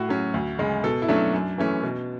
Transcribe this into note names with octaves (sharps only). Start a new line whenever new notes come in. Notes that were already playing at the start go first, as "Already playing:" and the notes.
Already playing: A2 F#4
F#3 C#4
D2
C#3 G#3
B2 A4
E4
F#3 A3 C#4 D4
F#2
E3 A3 C#4
B2